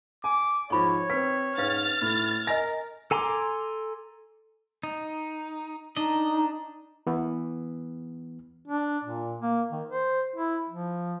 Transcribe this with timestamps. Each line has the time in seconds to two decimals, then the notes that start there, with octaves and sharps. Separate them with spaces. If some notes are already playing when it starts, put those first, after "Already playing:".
0.24 G#5 D6
0.70 G#2 F3 F4 C#5 B5 C#6
1.10 C4 B4 B6
1.58 G#2 C#4 B4 F5 F6 A6
2.01 A2
2.47 A#4 D#5 G#5 A#6
3.11 A4 G#5 A#5 C6 D6
4.83 D#4
5.97 D4 D#4 D#5
7.07 E3 B3
8.67 D4
9.04 A#2
9.41 A#3
9.72 D#3
9.89 C5
10.36 E4
10.69 F3